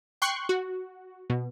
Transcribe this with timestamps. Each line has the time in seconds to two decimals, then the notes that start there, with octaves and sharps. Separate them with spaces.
0.22 G5 C6 C#6 F#6
0.49 F#4
1.30 B2